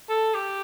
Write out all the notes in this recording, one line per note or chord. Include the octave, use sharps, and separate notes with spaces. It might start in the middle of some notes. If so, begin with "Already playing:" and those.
A4
G4